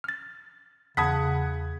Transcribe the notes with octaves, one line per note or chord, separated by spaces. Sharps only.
F6 A6
E2 C#3 F#5 A5 B5 D#6 G#6 B6